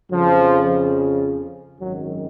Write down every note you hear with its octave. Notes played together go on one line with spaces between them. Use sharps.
F2 C#3 F3
G#1 F#2 D#3 F#3